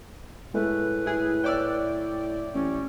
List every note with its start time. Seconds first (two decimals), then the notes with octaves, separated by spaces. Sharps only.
0.54 A2 G#3 A3 B4
1.06 E4 G#4
1.44 C#5 D5 E5 G5 E6
2.54 A1 C#4